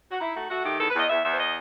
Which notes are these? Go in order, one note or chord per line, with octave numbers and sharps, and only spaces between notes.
F#4
D#4 E4
A3 F#4
A3 F#4
D#3 G4
E2 A4
B4
E2 D#5
E2 E5
E2 E5
C5
D#5